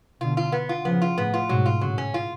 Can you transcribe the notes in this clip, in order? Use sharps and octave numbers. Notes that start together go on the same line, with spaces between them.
B2 D3 F4
F4
B3
F4
C#3 F3 B3
F4
A2 C#3 B3
F4
G#2 B2 F#3
F4
A2 C#3 F#3
C#4
F4